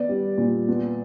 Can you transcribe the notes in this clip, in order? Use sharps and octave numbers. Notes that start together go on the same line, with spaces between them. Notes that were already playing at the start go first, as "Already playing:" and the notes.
Already playing: B3 D5
G3
A#2
B3